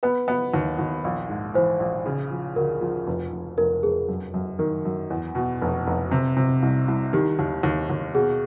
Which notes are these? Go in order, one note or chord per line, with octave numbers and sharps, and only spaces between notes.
B3 B4
B3
D#2
D#2
A#1
G#2
E3 C5
A#1
C#3
F3
D2 A#4
F3
F1
F1
F1 A#4
F1 G#4
F#2
F#2
D#3 A#4
F#2
E2
B2
F1
F1
C3
C3
C2
C2
D#3 G4
D#2
D#2
D#2
B2 G#4